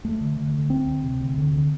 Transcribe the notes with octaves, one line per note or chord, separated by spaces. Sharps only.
D#2 A3
D3
D3
D3
D2 C4
D2
C3
D2
D3
D3